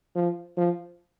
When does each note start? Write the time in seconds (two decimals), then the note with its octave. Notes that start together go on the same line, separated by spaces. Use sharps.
0.16 F3
0.57 F3